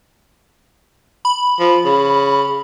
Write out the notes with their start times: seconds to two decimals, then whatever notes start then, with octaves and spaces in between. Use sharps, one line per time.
1.25 B5
1.59 F3
1.85 C#3